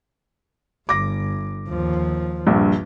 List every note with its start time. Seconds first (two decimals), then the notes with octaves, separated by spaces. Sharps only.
0.89 G1 D6 A#6
1.69 D#2 F3
2.47 A#1 G2